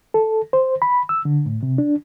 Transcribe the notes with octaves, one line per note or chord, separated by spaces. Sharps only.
A4
C5
B5
E6
D3
A2
C3
D4